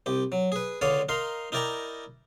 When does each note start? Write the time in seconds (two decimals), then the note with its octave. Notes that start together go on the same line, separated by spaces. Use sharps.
0.06 C2 G4
0.32 F#3
0.52 G#4 B4
0.81 C#2 D3 C#5 D5 F5 D#6
1.09 D#4 A#4 F5 C6
1.52 D#4 E4 A#4 D5 G5 A#5